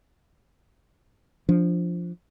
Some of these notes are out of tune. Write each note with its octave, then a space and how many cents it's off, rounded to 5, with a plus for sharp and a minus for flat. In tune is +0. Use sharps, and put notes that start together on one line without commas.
F3 +0 D4 +0